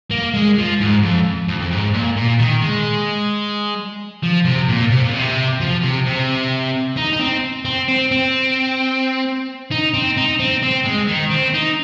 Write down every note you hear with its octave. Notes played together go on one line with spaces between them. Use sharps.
A#3
G#3
F3
G#2
F2
F2
F2
G#2
A#2
A#2
D#3
G#3
F3
C3
A#2
C3
A#2
C3
F3
C3
C3
D#4
D#4
C4
C4
C4
C4
D#4
C4
D#4
C4
C4
G#3
D#3
C4
D#4